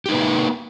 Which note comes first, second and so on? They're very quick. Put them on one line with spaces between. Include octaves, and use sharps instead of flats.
G4 D#4 B4 A#3